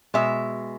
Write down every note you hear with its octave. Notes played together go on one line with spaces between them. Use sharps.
B2 G#3 E5